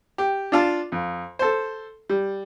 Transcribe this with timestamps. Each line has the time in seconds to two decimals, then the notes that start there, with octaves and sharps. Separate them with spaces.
0.18 G4
0.52 D4 F4 A5
0.92 F2
1.39 A4 C5
2.09 G3